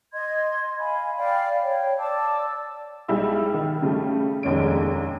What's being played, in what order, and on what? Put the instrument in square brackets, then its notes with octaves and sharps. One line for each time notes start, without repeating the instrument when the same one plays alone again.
[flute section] D#5 C6 G#6
F5 G#5 B5
D5 F5 G5 B5
C#5 G5
D5 A5 D6 E6
[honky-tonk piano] B1 G3 G#3 E4 E5 E6
D#3
C#3 G3 A3
F1 A#1 D#2 G#3 C#4 D7